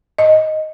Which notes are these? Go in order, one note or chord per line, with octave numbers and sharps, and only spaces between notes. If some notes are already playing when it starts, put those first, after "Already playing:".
D#5